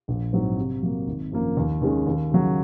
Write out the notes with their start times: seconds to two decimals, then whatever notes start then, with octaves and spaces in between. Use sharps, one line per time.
0.08 A#1
0.33 G#2 F#3 C4
0.57 C3
0.83 F#3 A#3
1.07 G#1
1.32 F#2 F3 A#3
1.57 D#2
1.82 D#3 G#3 C#4
2.07 D#2
2.31 C#3 F#3